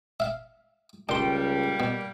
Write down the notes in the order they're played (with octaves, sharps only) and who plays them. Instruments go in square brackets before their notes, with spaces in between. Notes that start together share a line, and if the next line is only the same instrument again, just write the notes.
[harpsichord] E5 F5
[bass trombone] C#2 [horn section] G3 A#3 [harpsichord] D4 C6 [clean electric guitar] A#4 G5
[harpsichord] B2